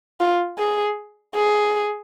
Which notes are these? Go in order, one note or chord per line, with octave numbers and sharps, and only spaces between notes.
F4
G#4
G#4